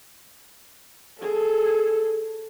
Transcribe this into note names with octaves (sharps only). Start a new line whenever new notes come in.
G#4 A4